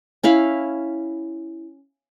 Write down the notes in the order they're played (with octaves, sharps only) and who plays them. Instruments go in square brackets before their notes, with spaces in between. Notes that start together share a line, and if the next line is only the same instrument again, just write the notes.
[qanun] C#4 E4 F5 B5